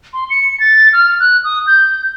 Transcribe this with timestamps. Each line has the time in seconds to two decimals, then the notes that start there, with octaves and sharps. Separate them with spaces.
0.13 C6
0.30 C#7
0.60 A6
0.93 F6
1.20 F#6
1.44 D#6
1.67 G6